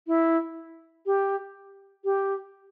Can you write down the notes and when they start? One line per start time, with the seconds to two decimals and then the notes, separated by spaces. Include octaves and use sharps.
0.07 E4
1.06 G4
2.05 G4